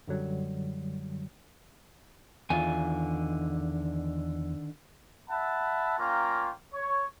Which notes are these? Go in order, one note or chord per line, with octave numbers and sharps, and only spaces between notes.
F#2 D3 F#3 G3
E2 D3 D#3 F4 G#5
E5 F#5 A5 B5
A#3 C#4 F4 G5 A#5
C#5